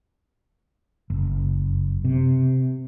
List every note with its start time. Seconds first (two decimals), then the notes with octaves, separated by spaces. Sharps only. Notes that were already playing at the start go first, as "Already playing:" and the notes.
1.10 F#1
2.05 C3